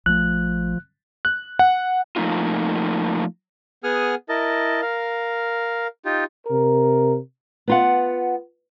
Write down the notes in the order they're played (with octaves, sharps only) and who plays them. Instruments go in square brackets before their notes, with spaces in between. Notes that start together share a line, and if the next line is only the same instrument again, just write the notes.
[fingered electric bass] A#1 A3 [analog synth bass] F3 [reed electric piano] F#6
[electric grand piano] F#6
F#5
[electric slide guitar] F3 A3 A#3 D#4 F4
[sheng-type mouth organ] B3 G#4 F#5 G#5 D#6 F6
E4 A#4 D#5 A5
A#4 F5
D#4 F4 G4
[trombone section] C3 A#4
[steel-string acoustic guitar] B3 F4 F#5